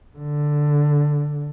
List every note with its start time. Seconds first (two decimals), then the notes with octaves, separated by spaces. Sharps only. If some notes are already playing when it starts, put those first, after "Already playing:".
0.18 D3